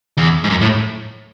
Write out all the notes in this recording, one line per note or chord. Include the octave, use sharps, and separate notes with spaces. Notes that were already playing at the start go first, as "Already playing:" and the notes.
E2
G#2
F#2
A2